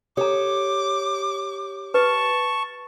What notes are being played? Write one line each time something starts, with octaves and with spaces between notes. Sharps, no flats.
G4 A4 C#5 A#5 D6
B4 A5 C#6